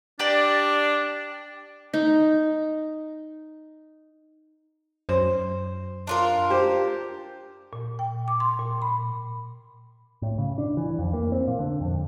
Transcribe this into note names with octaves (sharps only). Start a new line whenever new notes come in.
D4 G4 D5
D#4 A#5
F#2 C5
D4 F4 A#4
G4 C5
A#2
G5
D6
C6
A#2
B5
A2
C#3
D4
E3
F2
A#3
C4
A#2
D3
F2